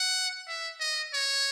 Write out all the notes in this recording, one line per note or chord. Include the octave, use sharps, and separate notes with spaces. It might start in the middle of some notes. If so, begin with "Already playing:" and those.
Already playing: F#5
E5
D#5
C#5